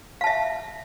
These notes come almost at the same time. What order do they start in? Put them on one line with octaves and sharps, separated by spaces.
F5 A5 E5